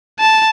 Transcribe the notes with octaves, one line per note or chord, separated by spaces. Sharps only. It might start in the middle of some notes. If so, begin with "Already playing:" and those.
A5